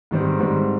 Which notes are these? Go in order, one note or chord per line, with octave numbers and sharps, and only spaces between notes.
G#2 D#3 G3 C4
G#2 D#3 G3 C4